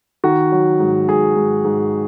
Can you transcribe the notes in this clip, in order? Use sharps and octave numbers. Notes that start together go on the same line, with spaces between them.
D#3 F#4
F#3
G#2
G#2 G#4
G#2
G#2